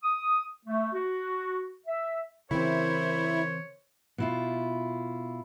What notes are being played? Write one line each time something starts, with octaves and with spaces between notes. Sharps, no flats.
D#6
A3
F#4
E5
C#3 E3 C4 E4 A#4 C5 C#5
B2 E4 F4